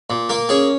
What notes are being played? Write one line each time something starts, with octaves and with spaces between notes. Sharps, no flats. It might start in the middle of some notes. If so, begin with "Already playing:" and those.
A#2
A#3 A#4
C#4 G#4